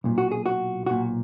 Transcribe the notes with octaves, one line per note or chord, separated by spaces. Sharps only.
B1 A#2
F#4
G#4
F#4
B1 A#2 F#4